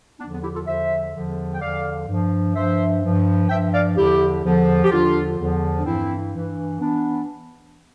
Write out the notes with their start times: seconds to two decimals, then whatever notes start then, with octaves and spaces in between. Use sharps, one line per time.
0.19 E2 D3 F3 B3 D4
0.32 B3
0.43 E4 G4
0.55 F4 A4
0.66 E2 D3 F3 C5 E5
1.13 E2 D3 F3
1.54 G5
1.60 E2 D3 F3 D5 F5
2.08 G2 F3
2.55 G2 F3 C5 E5
3.02 G2 F3
3.49 G2 F3 E5 G5
3.74 D5 F5
3.97 E2 D3 F3 E4 G4
4.44 E2 D3 F3
4.84 G4
4.91 E2 D3 F3 D4 F4
5.38 E2 D3 F3
5.79 D4
5.85 G2 E3 C4 E4
6.33 G2 E3
6.79 E3 B3 D4